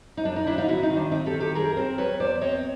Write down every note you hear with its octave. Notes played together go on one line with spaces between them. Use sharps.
D#4
F#2 D4
D#4
D#3 D4 E4
D#4 F4
C4 E4 F#4
D#4
D#3
D4
C4 D#4
G4 A4
D#3
G4 A4
F#2 G#4 A#4
C4 A#4 C5
E2 B4 C#5
E2 C5 D5
C4 C#5 D#5